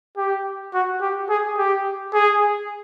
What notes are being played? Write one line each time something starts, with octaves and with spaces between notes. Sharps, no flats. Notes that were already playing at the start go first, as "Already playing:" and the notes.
G4
F#4
G4
G#4
G4
G#4